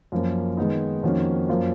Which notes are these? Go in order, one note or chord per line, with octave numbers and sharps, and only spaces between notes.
F#2 F3 A#3
D#3 G#3 B3 D#4
F2 D#3 A#3 C#4 F#4
F#2 F3 A#3 F4